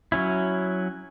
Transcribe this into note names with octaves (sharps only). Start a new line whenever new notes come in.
F#3 C#4 E4